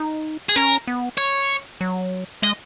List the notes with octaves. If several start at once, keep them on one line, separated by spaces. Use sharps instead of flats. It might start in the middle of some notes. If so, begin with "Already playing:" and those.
Already playing: D#4
G#4
C#4 A#4
B3
C#5
F#3
G#3 D#5